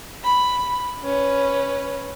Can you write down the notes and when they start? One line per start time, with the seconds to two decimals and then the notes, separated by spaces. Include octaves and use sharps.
0.24 B5
1.04 C#4 B4